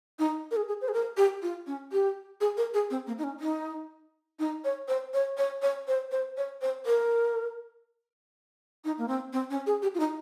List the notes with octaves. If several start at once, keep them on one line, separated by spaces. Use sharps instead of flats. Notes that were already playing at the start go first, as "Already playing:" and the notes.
D#4
A#4
G#4
G#4
C5
G#4
A#4
G4
F4
C#4
G4
G#4
A#4
G#4
C4
A#3
D#4
C#4
D#4
D#4
C#5
C5
C#5
C#5
C#5
C5
C5
C#5
C5
A#4
D#4
A#3
C4
C4
C#4
G#4
G4
F4
D#4